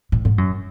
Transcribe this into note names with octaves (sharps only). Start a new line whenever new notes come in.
A2
G#2
F#2